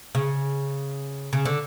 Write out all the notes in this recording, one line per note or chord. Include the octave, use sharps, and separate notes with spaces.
C#3
C#3
D3